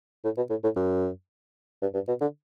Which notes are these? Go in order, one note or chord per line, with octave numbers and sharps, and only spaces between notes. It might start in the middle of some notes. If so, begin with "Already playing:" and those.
A2
B2
A2
A2
F#2
G2
G2
B2
D3